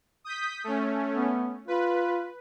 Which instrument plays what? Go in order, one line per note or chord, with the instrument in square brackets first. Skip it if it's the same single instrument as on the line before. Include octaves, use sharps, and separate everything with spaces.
[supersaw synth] D#6 G6 B6
A3 C#4
[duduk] B3
[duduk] F4 [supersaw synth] B4